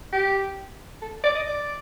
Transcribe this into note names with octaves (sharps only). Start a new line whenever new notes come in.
G4
A4
D5
D#5
D5